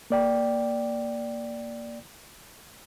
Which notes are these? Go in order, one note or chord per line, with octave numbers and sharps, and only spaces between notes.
A#3 D5 G5